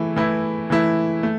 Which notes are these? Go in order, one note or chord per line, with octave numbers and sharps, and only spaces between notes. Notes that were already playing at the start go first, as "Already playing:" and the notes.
Already playing: E3 A3 E4
E3 A3 E4
E3 A3 E4
A3